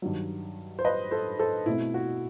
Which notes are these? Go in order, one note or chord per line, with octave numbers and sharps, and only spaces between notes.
G2 D#3 F#3
C5
B4 D#5
A4 C5
A4 C5
B2 A3 C4 E4
F#4